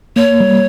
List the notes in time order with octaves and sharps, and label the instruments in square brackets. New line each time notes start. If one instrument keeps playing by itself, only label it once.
[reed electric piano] A#3 [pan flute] C#5
[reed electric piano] G3